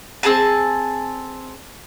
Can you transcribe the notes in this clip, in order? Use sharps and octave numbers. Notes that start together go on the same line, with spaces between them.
C4 G#4 G#5 A5